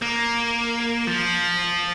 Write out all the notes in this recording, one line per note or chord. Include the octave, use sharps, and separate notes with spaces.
A#3
F3